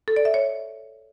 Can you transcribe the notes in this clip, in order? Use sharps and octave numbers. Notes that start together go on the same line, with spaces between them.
A4
D5
E5
C#5